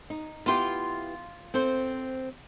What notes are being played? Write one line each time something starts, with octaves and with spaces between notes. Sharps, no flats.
D#4
B3 E4 F4 G4 C6
C4 A4 C5